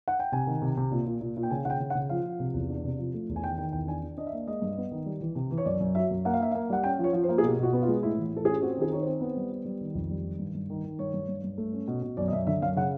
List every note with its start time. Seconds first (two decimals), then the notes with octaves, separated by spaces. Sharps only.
0.08 F#5
0.20 G5
0.32 C3 G#5
0.47 D#3
0.62 C3
0.77 C3
0.91 A#2
1.06 A#2
1.21 A#2
1.37 A#2
1.43 G5
1.50 C#3 G#5
1.65 C#3 F#5 G5
1.80 C#3
1.90 F#5
1.95 C#3
2.09 F3 F5
2.25 F3
2.40 C3
2.54 E2
2.69 D4
2.84 C3
2.98 F3
3.14 A3
3.29 E2
3.36 G#5
3.43 D#3 G5
3.58 D#3 G5
3.72 E2 G5
3.87 D4 G#5
4.02 D4
4.17 D4 D#5
4.27 E5
4.33 A#3
4.47 G#3 D#5
4.62 G2
4.77 B3
4.91 D#3
5.06 G3
5.21 E3
5.35 C3
5.51 E3
5.58 C#5
5.65 F#2 D5
5.80 F#2
5.95 F#3 E5
6.11 F#2
6.25 A#3 F#5
6.34 F5
6.40 A#3 E5
6.51 A#3 F5
6.70 G3 F#5
6.84 C#4 G5
6.99 F3
7.04 C#5
7.13 F3
7.23 C5
7.29 A#3
7.38 G#4
7.43 B2 G4
7.59 B2 F#4
7.73 B3
7.82 F4
7.88 G#3
8.03 A2 E4
8.18 E3
8.32 A2 A4
8.45 C#4 G#4
8.53 G4
8.62 C4 F#4
8.77 D#3 G#4
8.92 D#4 C#5
9.01 C5
9.06 C4
9.21 B3 C5
9.37 G3
9.51 B3
9.65 G3
9.81 D#3
9.95 F2
10.10 G3
10.24 D#3
10.39 G2
10.54 G2
10.70 D#3
10.84 D#3
10.99 G2 C#5
11.13 G2
11.28 G2
11.44 G2
11.58 A3
11.73 C#4
11.88 B2
12.02 B2
12.17 F#2 D5
12.28 D#5
12.32 F#2 E5
12.47 D3 E5
12.62 F#2 F5
12.76 C#3 F#5